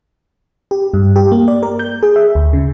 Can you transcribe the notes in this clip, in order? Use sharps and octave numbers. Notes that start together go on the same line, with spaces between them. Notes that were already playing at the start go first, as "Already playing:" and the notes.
G4
G2
G4
A#3
D5
A#4
G6
G#4
E5
D2
C#3